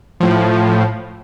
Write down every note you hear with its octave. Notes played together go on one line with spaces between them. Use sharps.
A2 F3